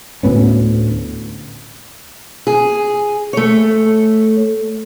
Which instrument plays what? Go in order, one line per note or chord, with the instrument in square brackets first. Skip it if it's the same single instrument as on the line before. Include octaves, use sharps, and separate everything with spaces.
[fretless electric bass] D2 A2 B3 C#4
[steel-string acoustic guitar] G#4
A3 C#5